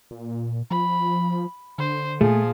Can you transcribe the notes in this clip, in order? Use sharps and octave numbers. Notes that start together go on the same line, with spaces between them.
A#2
F3 B5
D3 C5
A#2 F3 A3 G#4